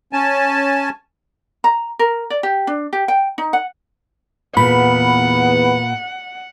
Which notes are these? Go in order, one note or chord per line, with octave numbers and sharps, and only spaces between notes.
C#4 G#5 A5
A#5
A#4
D5
G4
D4
G4
G5
D#4
F#5
E2 A#2 B3 B4 F#5 B5